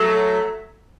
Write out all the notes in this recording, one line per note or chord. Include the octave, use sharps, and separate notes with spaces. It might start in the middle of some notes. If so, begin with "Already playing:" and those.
Already playing: F#3 A3